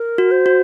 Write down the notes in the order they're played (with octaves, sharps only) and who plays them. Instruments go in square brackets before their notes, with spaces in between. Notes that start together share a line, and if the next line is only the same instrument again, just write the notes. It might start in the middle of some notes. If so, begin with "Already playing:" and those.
Already playing: [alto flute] A#4
[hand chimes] F#4
[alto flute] C5
[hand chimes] F#4